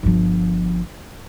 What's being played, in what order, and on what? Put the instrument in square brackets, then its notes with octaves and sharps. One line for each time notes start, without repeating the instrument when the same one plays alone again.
[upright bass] G1 F3